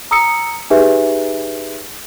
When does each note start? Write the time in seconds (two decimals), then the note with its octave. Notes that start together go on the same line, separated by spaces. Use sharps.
0.11 A#5 D#6 E6 C#7
0.70 D#4 G4 G#4 B4 E5